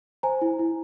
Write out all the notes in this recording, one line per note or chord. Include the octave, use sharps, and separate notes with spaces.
C5 G#5 A#5
E4
E4